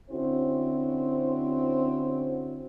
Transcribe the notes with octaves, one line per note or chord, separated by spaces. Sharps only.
D3 C4 C#4 E4 F#4 C5